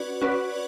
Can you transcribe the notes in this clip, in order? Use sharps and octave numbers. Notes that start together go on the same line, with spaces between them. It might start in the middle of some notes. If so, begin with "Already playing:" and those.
Already playing: C#4 F#4 B4 D5
C#4 F#4 B4 D5